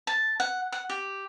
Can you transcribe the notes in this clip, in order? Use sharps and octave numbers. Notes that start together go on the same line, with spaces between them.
A5
F#5
F#5
G4